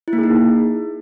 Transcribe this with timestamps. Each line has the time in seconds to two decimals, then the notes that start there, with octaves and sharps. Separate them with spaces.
0.08 E4
0.13 A#3
0.18 G#4
0.24 D#4